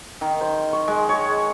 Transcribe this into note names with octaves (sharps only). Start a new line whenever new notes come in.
D#3
C5
C#6
G#3
C#5